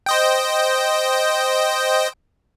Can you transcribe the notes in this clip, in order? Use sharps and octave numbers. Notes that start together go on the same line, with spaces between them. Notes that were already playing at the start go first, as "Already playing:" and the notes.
C5 D#5 G5